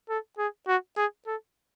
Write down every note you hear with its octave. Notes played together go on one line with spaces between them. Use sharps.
A4
G#4
F#4
G#4
A4